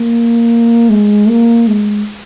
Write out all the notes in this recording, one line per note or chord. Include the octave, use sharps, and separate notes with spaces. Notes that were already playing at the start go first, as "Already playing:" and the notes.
Already playing: A#3
G#3
A#3
G#3